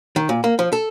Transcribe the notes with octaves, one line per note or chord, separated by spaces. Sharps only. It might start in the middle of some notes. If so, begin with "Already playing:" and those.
D#3
A#2
A#3
F3
A4